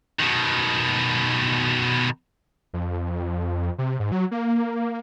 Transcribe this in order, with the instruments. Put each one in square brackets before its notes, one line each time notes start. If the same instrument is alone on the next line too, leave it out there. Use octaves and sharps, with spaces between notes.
[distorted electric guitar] B2 D#3
[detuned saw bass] F2
C3
G#2
F#3
A#3